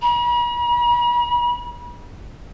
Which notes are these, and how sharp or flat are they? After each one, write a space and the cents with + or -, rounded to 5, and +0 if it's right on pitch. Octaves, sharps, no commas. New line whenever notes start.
B5 -45